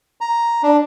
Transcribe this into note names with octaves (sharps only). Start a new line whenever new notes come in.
A#5
D4